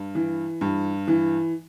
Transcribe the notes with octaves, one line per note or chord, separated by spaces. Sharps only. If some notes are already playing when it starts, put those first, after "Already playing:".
Already playing: G2
E3
G2
E3